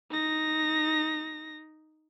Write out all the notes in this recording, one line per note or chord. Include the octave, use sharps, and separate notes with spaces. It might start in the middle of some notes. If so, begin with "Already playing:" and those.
D#4 A#6